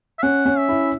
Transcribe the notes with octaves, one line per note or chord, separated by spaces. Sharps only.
E5
C#4 F#5
C#4
E5
E4